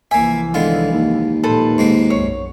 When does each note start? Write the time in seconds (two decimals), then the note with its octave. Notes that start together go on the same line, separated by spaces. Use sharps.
0.11 C2 E3 F3 A#3 E5 G#5
0.54 D3 D#3 G#3 B3 F4
0.92 D#2
1.44 A#2 F3 A4 B4 C5
1.78 E2 G#2 B2 G#3 A#3
2.10 B1 F#2 C#5